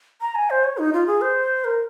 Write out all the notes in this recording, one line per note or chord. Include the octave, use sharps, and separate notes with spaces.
A#5
G#5
C5
C#5
D#4
F4
G#4
C5
A#4